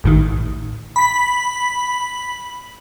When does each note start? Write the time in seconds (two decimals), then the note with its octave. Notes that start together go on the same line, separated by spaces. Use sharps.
0.04 A1 A2 D#3
0.96 B5 B6